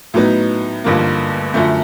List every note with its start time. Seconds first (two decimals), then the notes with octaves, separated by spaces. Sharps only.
0.14 A2 F#3 B3 D#4
0.84 A1 G2 D3 F3 A#3
1.54 F#2 D3 F3 A3